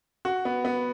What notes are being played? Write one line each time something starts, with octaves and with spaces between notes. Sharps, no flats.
F#4
B3
B3